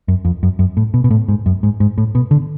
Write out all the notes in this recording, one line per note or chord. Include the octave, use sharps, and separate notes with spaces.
F#2
F2
F#2
F#2
A2
B2
B2
A2
G#2
F#2
G#2
G#2
A2
B2
D3